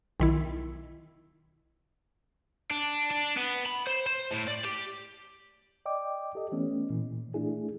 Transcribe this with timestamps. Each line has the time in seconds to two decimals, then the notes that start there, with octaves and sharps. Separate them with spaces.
0.20 B1 D#3 E4
2.71 D4
3.11 D4
3.37 B3
3.66 B5
3.87 C5
4.06 C5
4.31 A2
4.47 D5
4.65 G4
5.86 D5 D#5 G5 D6
6.35 G4 A4 D#5
6.52 E3 A3 B3 C#4
6.90 A#2 E3
7.34 A3 D4 E4 G#4